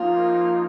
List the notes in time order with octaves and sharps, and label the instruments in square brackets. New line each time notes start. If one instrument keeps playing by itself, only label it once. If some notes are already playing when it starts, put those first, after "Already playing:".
Already playing: [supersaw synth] F3 A#3 D#4 [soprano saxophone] F4